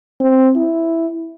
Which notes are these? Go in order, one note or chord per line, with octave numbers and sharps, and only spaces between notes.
C4
E4